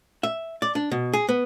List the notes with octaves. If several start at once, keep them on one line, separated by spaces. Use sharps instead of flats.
E5
D5
D4
B2
G#4
B3